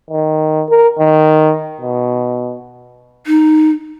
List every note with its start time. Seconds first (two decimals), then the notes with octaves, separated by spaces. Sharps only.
0.11 D#3
0.70 A#4
0.99 D#3
1.81 B2
3.27 D#4